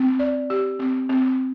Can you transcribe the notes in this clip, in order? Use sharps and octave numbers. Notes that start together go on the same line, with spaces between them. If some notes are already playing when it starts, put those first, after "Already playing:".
Already playing: C4
D5
G4
C4
C4